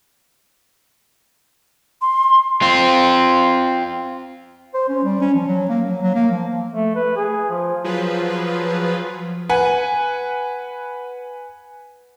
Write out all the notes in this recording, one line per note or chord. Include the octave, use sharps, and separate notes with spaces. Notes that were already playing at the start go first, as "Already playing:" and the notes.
C6
C4 F4
C5
C#4
G3
C#4
F3
F#3
A#3
F#3
F#3
A#3
F3
A3
B4
G#4
F3
F3 F#3 F4 G#4 B4
B4 F#5 G#5